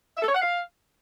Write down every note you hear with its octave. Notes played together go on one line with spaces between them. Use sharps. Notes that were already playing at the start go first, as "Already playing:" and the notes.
E5
A4
C#5
F#5
F5